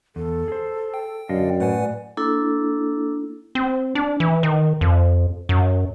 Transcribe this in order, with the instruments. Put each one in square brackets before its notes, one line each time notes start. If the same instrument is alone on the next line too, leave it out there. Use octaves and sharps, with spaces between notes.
[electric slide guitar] E2 [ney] A4
[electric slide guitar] G#4 C5
[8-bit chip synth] G5
[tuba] F#2 [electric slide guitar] D3 D#5 F5 [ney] D5
[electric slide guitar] A2 [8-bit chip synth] B4 F#5 G#5
[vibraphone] A#3 D4 E4 A4
[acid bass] C4
D4
E3
D#3
F2
F#2